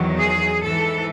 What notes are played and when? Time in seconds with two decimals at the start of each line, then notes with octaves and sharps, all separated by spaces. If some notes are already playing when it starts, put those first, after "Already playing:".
Already playing: E2 D#3 F#3
0.16 G#4
0.60 G#2 E3 A4